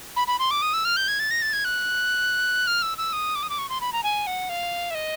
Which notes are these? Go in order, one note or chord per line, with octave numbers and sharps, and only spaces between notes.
B5
B5
C6
D6
D#6
E6
F6
G6
G#6
A6
A#6
A6
G#6
F#6
F6
E6
E6
D#6
D6
D#6
D6
C#6
C6
B5
A#5
G#5
F#5
F5
E5
D#5